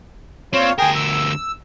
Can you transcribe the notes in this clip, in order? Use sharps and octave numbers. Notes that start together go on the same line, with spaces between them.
A#2 C4 F4 C#5
D2 G#4 A#4 G5
E6